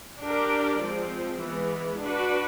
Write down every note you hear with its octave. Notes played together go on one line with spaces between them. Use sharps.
D4 G4 A#4 D5
F3 G#3 C4
E3 G#3 B3
D4 F#4 B4 D5